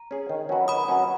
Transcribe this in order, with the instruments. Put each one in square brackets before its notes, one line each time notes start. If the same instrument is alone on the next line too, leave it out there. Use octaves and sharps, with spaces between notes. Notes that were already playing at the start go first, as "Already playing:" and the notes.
Already playing: [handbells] A#5
[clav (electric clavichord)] C#4 G#4
D#3
F#3 C#4 F#4 B4
[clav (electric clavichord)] D#3 [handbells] B5 D#6
[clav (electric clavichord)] F#3 C#4 F#4 B4